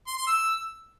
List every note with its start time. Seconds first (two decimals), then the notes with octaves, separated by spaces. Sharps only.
0.07 C6
0.17 C6
0.27 E6